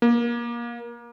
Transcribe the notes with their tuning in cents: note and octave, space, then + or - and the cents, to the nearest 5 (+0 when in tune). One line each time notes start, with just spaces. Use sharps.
A#3 +25